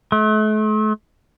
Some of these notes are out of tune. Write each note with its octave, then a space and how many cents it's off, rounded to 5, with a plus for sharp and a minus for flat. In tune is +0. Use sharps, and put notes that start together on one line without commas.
A3 -40